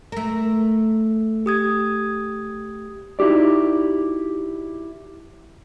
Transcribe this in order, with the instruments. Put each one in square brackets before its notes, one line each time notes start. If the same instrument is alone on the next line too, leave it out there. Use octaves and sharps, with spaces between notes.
[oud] A3 A#4
[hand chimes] G4 D#6 G#6
[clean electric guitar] D#4 E4 F#4 G4 D5